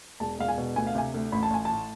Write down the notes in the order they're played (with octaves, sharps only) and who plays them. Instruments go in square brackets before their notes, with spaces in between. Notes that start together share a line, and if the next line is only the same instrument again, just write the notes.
[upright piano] E1 A5
E1 F5
G#5
B2
D2 G#5
F5
C3 G#5
D2
A1 B5
A5
A1 G#5
A2 A5